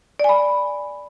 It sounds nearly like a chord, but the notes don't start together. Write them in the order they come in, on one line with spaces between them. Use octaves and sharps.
D5 G#5 B5